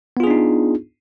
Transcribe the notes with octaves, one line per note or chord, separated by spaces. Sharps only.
B3 D4 D#4 F4 G#4